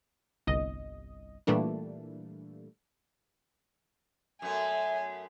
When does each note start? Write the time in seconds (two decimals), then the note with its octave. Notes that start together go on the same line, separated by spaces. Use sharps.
0.47 G1 C2 D#5
1.47 A#2 E3 G3 A3 A#3 D4
4.42 F#2 A3 B3 G#5